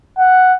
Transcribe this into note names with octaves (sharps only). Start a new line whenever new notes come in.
F#5